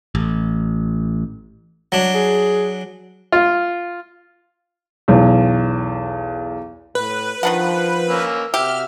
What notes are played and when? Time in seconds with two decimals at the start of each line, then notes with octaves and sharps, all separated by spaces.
0.15 A1
1.92 F#3 D4
2.14 G#4
3.32 F4
5.08 B1 E2
6.95 A2 B4
7.43 D#3 F3 D4 F#5
8.10 A#3 C#4 E6
8.54 C3 F#4 G4 E5 F6